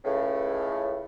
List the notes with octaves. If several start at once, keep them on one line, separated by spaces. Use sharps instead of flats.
C#2 A2 C#3